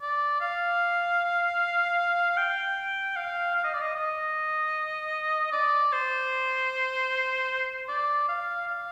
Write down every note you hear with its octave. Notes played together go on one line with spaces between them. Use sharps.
D5
F5
G5
F5
F5
D#5
D5
D#5
D#5
D5
C5
D5
F5
F5